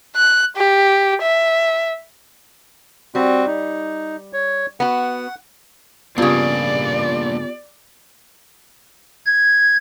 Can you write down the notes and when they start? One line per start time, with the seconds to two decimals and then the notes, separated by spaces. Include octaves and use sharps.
0.16 F#6
0.56 G4
1.22 E5
3.15 G3 C4 F#4
3.47 D#4
4.33 C#5
4.80 B3 F#4 F#5
6.18 G2 C#3 A#3 B3 D4 F4 G4 D5
9.26 G#6